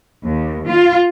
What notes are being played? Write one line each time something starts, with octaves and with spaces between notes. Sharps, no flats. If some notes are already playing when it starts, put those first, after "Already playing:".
D#2
F4